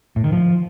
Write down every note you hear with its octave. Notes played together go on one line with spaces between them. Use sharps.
A2
D#3
F3